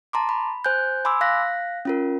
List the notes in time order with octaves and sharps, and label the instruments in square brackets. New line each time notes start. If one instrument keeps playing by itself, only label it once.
[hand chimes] A5 A#5 C6 D6
B5
C5 G#5 F#6 G6
G#5 B5 C6 D6 E6
F5 F#6 A#6 B6
C#4 F4 A#4